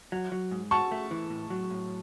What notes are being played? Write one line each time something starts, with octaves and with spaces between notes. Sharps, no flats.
F#3
F#3
G#2
F#4 A5 C#6
A3
E3
A2
F#3
A2